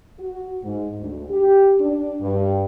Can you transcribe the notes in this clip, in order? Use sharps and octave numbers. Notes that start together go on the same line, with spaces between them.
F#4
G#2
D2
G4
D4
G2